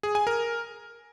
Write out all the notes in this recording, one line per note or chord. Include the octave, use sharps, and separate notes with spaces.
G#4
G#5
A#4